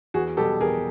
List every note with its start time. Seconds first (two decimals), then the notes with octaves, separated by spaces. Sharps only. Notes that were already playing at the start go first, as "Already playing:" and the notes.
0.14 E2 F#4 G#4
0.37 B2 G3 G4 A4
0.61 E2 G#4 A#4